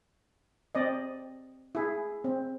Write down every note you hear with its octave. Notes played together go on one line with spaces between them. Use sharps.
C4 D5 D#5
E4 G#4
C4